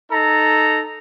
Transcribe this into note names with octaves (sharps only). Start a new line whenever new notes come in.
D#4 A4 A#5